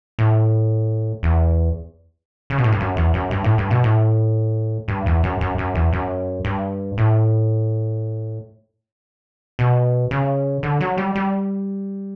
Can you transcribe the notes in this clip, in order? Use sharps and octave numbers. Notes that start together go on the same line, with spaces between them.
A2
E2
C#3
B2
A2
G2
F#2
E2
F#2
G2
A2
G2
B2
A2
G2
E2
F#2
F#2
F#2
E2
F#2
G2
A2
B2
C#3
D3
F#3
G3
G3